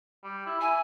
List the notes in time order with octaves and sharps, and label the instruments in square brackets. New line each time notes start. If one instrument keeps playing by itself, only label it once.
[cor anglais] G3
E4
[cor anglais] E5 [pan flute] G#5